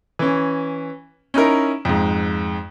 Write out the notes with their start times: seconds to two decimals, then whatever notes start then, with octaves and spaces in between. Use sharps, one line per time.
0.19 E3 C#4
1.34 C#4 D#4 E4 A#4
1.85 F2 G#2